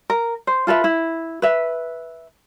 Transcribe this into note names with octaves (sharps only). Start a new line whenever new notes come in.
A#4
C5
F4 A4 B4 E5
E4
B4 E5